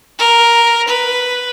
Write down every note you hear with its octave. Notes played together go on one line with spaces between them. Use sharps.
A#4
B4